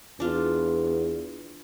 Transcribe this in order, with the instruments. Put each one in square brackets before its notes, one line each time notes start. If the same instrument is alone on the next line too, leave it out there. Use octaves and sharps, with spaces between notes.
[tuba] E2 [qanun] D4 F4